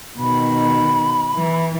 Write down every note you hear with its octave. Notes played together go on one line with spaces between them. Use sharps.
B2 D#3 B5
E3